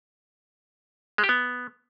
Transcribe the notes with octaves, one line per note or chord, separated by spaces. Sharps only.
G#3
G4
B3